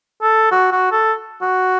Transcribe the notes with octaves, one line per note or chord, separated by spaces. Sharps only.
A4
F#4
F#4
A4
F#4